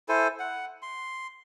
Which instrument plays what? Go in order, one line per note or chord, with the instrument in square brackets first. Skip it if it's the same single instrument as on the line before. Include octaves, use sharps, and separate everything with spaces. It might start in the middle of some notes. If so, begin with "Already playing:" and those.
[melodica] E4 A4 C5 G#5
F#5
C6